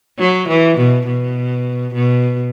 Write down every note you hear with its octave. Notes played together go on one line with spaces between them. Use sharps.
F#3
E3
B2
B2
B2